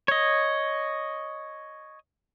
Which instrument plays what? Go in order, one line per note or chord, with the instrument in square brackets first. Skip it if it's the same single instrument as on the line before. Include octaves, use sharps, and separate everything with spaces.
[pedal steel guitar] C#5 D#5